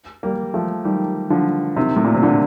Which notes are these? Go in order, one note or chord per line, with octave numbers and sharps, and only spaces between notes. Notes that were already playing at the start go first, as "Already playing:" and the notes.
G3 A#3
F3 A3
D#3 G3
D3 F3
C3 D#3
A2
A#2
C3
A#2 D3